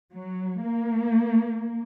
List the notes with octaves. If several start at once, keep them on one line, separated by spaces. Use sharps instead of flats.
F#3
A#3